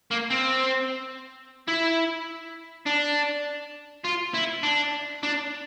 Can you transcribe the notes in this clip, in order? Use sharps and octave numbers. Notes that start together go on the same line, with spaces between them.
A#3
C4
E4
D4
F4
E4
D4
D4